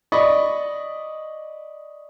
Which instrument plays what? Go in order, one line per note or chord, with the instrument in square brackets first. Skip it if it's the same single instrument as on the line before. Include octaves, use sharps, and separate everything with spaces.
[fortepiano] D5 D#5 B5 C#6